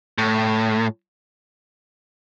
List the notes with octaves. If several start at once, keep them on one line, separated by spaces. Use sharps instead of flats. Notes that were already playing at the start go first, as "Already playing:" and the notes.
A2